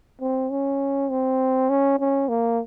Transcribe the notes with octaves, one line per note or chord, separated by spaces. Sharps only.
C4
C#4
C4
C#4
C#4
A#3